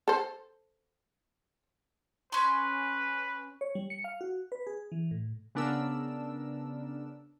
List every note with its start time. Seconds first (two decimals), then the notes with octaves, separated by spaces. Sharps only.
0.08 A4 C5
2.32 C#4 B4 C6
3.61 C#5
3.75 G3
3.90 C#7
4.04 F5
4.21 F#4
4.52 B4
4.67 G#4
4.92 E3
5.11 A2
5.55 C#3 B3 D4 A#4 E6